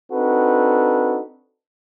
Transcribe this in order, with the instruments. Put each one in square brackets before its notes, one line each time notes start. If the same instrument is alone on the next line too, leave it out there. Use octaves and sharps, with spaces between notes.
[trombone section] C4 D4 D#4 F#4 A4 B4